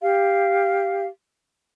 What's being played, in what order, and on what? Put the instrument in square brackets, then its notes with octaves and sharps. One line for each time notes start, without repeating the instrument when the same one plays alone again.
[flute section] G4 F5